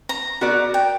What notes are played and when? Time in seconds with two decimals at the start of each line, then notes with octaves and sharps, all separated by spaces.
0.09 A#5
0.41 B3 F#4 A#4 D5
0.74 G5